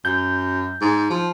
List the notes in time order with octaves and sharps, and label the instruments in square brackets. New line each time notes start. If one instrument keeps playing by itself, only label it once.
[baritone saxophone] F#2 [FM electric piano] G6
[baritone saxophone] G#2
F3